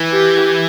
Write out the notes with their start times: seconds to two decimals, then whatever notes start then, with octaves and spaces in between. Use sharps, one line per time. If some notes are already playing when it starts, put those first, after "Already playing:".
Already playing: E3
0.13 G4